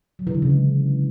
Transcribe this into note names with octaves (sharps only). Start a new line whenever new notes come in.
F#3
E3
D3
C#3
G#3